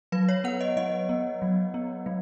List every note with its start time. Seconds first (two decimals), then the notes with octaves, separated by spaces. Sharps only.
0.12 F#3 B4
0.29 C#5
0.44 B3 F#5
0.61 D#5
0.77 F#3 D#5
1.09 B3
1.42 F#3
1.74 B3
2.06 F#3